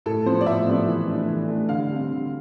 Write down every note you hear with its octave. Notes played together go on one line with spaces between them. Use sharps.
A2 A4
F3 B3 C5
D5
A2 E5
F3 B3
E3
A3 D4
E3
A3 D4
D3 F5
G3 C4
D3